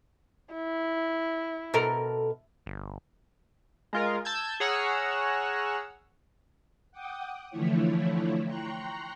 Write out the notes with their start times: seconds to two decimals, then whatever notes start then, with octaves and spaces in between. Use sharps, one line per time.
0.54 E4
1.74 B2 A4 A#4
2.66 G1
3.93 G#3 F4 A#4
4.25 A5 E6 G6 G#6
4.60 G#4 C#5 F#5 A#5 E6 F6
6.91 F#5 G5 D6 D#6
7.50 D3 E3 F3 A3 E4 C#5
8.45 G5 A#5 C6 C#6 F#6